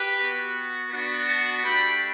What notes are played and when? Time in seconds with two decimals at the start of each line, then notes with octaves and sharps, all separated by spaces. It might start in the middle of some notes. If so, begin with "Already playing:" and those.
Already playing: G4 B4
0.16 F#4
0.21 B3
0.90 B3 D4 F#4
1.27 F#5 A5
1.62 A3 D4 G4 G5 B5